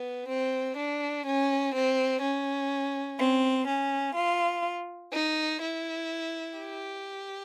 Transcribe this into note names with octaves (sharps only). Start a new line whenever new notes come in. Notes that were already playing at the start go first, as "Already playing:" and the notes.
Already playing: B3
C4
D4
C#4
C4
C#4
C4
C#4
F4
D#4
E4
G4